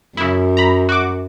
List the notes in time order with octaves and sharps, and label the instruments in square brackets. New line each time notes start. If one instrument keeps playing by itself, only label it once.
[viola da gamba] F#2 [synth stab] C#3 E4
[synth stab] A#5 B5
F#4 D6